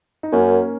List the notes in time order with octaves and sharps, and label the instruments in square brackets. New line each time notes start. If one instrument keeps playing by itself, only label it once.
[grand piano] D#4
[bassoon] F#2 [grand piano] A#3 C#4